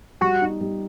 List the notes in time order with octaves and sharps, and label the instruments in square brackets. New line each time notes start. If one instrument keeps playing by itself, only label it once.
[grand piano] G3 [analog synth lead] F#4
[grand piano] D#4
G3